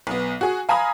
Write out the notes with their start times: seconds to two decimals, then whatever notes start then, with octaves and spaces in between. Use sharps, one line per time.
0.07 B1 B3
0.41 F#4 G#4
0.69 F5 G#5 A#5 B5 D#6